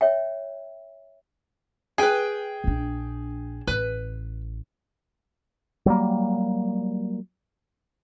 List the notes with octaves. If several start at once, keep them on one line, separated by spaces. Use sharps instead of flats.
C#5 E5 G5
G#4 B4 G5 G#5
A#1 D4
A1 B4
F#3 G3 A#3